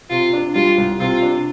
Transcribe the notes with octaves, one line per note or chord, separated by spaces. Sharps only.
C3 F4
D4
G3 F4
C2
C3 F4
D4